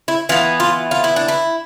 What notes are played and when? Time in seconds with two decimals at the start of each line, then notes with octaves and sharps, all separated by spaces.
0.08 E4
0.29 E3 B3 F4
0.60 F4
0.91 F4
1.04 E4
1.16 D4
1.28 E4